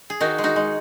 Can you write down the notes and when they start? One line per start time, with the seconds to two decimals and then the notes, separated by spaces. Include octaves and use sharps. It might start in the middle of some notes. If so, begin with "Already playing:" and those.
0.10 G#4
0.20 D#3 D#4 F#4
0.38 G#3
0.43 D#4 F#4
0.56 G#3